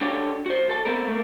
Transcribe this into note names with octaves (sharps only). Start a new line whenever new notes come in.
D4 F#4 G4 A4 C#5
F#4 C5
B1 A4 A5
B3 C4 A4 A#4
A3 A#3